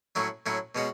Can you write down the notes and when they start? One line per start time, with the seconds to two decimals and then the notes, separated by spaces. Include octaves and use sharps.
0.15 A2 F#3 C#4 E4
0.46 A2 F#3 C#4 E4
0.75 B2 G#3 C#4 F#4